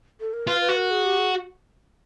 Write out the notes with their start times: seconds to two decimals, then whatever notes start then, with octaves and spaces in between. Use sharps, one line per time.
0.20 A4
0.33 A#4
0.47 F4 B4
0.61 B4
0.69 F#4
0.76 A#4
0.91 G#4
1.05 G4
1.19 G#4